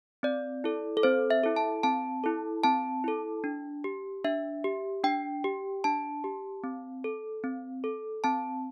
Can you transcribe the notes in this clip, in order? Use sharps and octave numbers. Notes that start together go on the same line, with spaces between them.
C4 D5
E4 A4
A4
C4 C5
E5
E4 A4
A5
C4 A5
E4 A4
C4 A5
E4 A4
D4
G4
D4 E5
G4
D4 G5
G4
D4 A5
G4
C4
A4
C4
A4
C4 A5